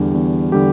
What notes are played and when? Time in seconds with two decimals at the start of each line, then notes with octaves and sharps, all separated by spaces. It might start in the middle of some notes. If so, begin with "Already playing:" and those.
Already playing: E2 D3 G3 D4 G4
0.14 E2
0.52 D3 G3 D4 G4